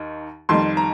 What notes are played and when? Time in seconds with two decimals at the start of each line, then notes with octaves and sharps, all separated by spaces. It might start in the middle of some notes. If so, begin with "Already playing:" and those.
Already playing: D#2 D#3
0.49 F2 D#3 G3 C6
0.77 A#5